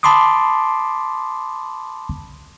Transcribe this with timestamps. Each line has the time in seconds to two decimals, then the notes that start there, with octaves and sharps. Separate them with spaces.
0.03 A5 B5 C6 D6 D#6